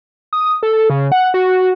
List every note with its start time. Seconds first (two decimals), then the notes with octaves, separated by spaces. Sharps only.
0.33 D#6
0.63 A4
0.90 C#3
1.12 F#5
1.34 F#4